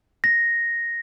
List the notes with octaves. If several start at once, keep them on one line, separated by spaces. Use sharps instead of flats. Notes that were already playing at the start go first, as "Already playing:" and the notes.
A#6